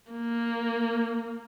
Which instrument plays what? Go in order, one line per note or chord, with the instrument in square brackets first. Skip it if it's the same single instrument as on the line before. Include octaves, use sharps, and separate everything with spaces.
[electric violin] A#3